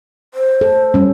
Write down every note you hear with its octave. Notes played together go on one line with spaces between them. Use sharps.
C5
A4
G3 C#4